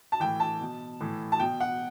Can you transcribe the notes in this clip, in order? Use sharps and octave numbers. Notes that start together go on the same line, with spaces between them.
A5
A2 E3 G5
A5
B2
A2 E3
A5
B2 G5
F#5